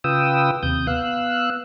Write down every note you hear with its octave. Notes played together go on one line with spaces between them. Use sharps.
C#3 F4 B4 G5 D#6 E6
D#2 C3 D#6 G6
B3 F5 E6 F#6